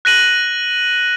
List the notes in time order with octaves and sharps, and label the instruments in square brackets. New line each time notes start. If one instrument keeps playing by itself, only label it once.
[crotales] F#6 A#6 D#7 F#7